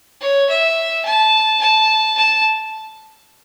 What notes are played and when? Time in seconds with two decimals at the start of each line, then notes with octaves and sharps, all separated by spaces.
0.21 C#5
0.49 E5
1.05 A5
1.61 A5
2.17 A5